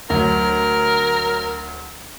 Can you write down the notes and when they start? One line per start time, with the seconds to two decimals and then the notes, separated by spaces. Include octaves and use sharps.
0.10 D2 F#3 A#4